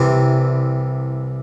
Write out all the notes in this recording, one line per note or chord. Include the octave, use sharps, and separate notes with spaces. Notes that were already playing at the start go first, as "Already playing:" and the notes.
Already playing: C2 C3 E3 G3